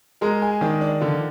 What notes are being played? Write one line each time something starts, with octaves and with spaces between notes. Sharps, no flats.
G#3 A#4 A#5
G#4 G#5
D#3 D4 D5
D4 D5
D3 F3 F4